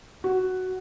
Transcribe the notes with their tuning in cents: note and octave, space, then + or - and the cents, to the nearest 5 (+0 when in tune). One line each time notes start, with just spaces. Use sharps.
F#4 +5